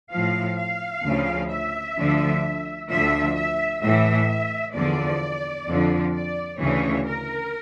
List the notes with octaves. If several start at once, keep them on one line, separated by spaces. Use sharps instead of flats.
A2 F3 F5
F5
D2 C#3 F3
E5
D2 D3 F3
D2 D3 F3 E5
E5
A2 E3 E5
E2 D3 F3 D5
F2 D3 F3
D5
D2 C#3 E3 C#5
A#4